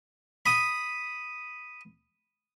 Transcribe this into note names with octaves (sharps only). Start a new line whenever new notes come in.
B5 D#6